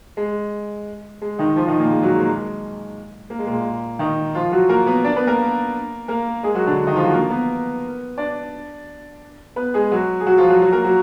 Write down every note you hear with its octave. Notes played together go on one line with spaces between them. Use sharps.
G#3
G#3
D#3 D#4
F3 F4
D#3 D#4
A#2 A#3
G#3
F#3
G#3
A#3
G#3
A#3
G#3
A#2 A#3
D#3 D#4
F3 F4
F#3 F#4
A#3 A#4
B3 B4
D4 D5
B3 B4
A#3 A#4
A#3 A#4
G#3 G#4
F#3 F#4
D3 D4
D#3 D#4
F3 F4
F#3 F#4
A#3 A#4
B3 B4
D4 D5
B3 B4
G#3 G#4
F#3 F#4
G#4
F#3 F#4
F3 F4
F#3 F#4
F#3 F#4
A#3 A#4
F#3 F#4